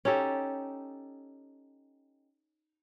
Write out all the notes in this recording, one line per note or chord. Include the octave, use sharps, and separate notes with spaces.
C#4 D#4 G4 A4